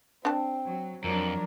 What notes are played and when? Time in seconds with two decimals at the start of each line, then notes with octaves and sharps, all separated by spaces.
0.25 C4 D4 A5
0.67 F#3
1.04 F2 F3 F#3 D4 A#4